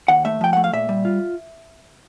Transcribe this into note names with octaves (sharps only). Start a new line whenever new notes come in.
D#2 F#5
A3 E5
F3 G5
A3 F#5
F5
A#2 E5
G3
F4